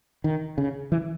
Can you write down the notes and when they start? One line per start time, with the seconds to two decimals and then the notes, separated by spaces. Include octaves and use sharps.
0.24 D#3
0.58 C#3
0.92 E3